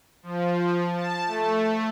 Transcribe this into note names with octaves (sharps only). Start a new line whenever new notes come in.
F3
A5
A3